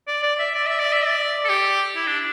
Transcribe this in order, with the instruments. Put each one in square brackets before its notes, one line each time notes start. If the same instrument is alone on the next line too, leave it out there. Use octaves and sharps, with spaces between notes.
[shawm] D5
D5
E5
D5
E5
D5
E5
D5
A4
G4
E4
D4